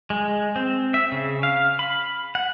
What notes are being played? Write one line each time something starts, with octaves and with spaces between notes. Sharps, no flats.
G#3
C4
E5
C#3
F5
B5
F#5